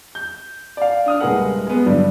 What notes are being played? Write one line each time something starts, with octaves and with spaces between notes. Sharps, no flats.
G6
D5 F5
D4 D#6 F6
D#1 G#3 G#4 A#4 B4 F#5
G#3 B3
G2 D3 G3